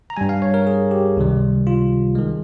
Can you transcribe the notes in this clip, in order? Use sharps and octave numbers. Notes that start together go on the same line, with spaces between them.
A#5
G2 G3 G#5
F5
C#5
A#4
G#4
G4
C#2 C3 D#3 G3
F4
D#3 G#3